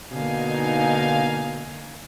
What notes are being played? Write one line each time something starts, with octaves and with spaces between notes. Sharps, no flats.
B2 D3 A#3 D#4 F5 G#5